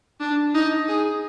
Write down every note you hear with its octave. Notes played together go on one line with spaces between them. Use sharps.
D4
D#4
G#4